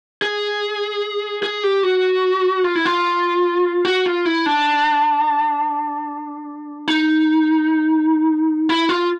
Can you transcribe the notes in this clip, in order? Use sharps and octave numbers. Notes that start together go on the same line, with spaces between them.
G#4
G#4
G4
F#4
F4
E4
F4
F#4
F4
E4
D4
D#4
E4
F4